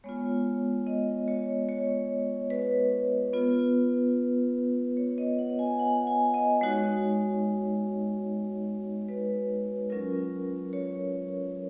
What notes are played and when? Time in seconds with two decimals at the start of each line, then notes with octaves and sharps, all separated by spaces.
0.04 G#3 B3 F4 C#5
0.87 D#5
1.28 C#5
1.69 C#5
2.50 B4
3.33 B3 F4
4.97 C#5
5.18 D#5
5.39 F#5
5.59 G#5
5.79 F#5
6.07 G#5
6.34 D#5
6.61 G#3 D#4 F#4 C#5
9.08 B4
9.90 F#3 C#4 F4 A#4
10.73 C#5